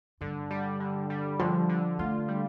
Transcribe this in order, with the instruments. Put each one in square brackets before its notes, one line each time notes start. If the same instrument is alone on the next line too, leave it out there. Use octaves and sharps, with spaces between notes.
[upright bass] G2 [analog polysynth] D3
[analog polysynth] G3
D3
G3
[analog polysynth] D3 [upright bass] F3
[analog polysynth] D3
[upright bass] A3 [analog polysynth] F4
[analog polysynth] G3